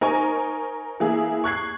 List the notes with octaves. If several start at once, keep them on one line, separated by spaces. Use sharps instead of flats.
D#4 A#4 C5 G#5 C#6
E3 A#3 E4 G#4
C#6 F#6 G#6 C7